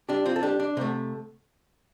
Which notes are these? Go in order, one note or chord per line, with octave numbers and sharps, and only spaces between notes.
D4 G4
C4 F4
A4
D4 G4
D4
C3 A3 C4